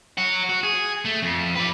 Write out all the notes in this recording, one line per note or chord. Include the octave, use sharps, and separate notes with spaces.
C#5 F#5
F#4
G#4
A3
F2
B4 D5